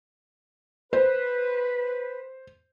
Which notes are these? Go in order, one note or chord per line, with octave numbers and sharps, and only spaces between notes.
B4 C5